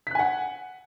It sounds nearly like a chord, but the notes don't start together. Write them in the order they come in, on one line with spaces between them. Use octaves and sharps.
B6 F#6 G#5 F#5